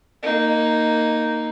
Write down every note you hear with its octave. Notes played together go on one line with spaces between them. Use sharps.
A#3 D#4